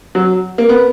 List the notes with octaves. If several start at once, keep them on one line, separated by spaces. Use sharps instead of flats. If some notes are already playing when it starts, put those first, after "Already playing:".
F#3
A#3
B3